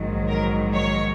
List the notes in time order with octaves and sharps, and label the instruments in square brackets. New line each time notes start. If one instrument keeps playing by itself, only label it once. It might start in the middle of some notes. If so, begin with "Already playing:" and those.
Already playing: [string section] A#1 G#2 D#3 F#3
A#4
C#5